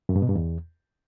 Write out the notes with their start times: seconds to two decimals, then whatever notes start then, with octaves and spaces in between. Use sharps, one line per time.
0.09 F#2
0.16 G2
0.22 B2
0.29 G2
0.35 E2